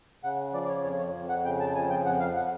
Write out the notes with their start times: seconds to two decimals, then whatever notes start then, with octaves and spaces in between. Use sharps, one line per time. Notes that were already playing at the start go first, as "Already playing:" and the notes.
0.23 C#3 F#5
0.53 F3 D5
0.64 D5
0.68 C#5
0.83 F2 C#5
0.99 C#5
1.14 F2
1.29 F#5
1.44 C#3 G5
1.60 A5
1.75 F3 G#5
1.90 G5
2.05 F2 F#5
2.20 F5
2.35 F#5